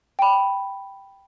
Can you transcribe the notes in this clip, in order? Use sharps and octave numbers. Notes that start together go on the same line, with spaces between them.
G5 B5